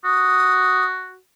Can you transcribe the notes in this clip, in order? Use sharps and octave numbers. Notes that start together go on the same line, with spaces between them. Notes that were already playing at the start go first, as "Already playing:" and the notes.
F#4 D#6